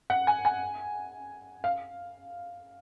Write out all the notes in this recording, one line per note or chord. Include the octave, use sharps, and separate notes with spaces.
F#5
G#5
G#5
F5